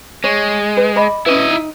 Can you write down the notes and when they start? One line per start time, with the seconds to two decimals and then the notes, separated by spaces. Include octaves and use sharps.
0.24 G#3 C#5
0.77 B4
0.96 D5 D#5 B5
1.26 C#4 E4 F#4 B4 D#5
1.50 D#4